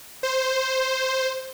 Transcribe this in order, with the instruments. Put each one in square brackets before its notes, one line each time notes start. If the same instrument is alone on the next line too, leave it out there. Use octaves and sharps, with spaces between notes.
[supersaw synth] C5